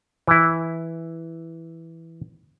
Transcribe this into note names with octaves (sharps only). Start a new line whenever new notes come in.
E3 E4